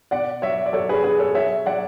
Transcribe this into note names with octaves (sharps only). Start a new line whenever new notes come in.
B2 D5 F#5
F#3 C#5 E5
D5
F#3 A4 C#5
G#4 B4
B2 G#4 B4
A4 C#5
F#3 C#5 E5
F#3 D5 F#5